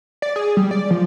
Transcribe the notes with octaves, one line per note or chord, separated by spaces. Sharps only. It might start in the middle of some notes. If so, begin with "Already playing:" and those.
D5
G#4
G3
D5
F3